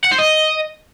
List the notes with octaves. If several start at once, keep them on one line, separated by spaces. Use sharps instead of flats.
F#5
C5
D#5